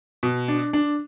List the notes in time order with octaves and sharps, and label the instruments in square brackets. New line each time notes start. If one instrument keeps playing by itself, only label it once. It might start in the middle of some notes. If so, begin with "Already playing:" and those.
[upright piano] B2
D4
D4